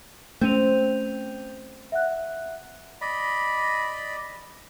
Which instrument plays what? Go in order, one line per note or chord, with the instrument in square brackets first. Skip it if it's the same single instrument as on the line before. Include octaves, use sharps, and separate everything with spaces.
[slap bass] A3 C#4 [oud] C4 [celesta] G6 D#7 F7
[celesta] E5 F#5 F#6
[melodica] D5 D#5 B5